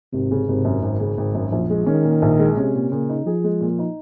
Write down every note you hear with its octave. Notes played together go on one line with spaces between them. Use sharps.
G#1 C3
C#3
G#1 C3
F#2
G#1
C#3
G#1
F#2
A#1 F3
G#3
D#3 C#4
A#2
A#1
G#3
C3 C#4
A#2
A#2 C#3
D#4
F3 G#4
G#3
A#2
D#4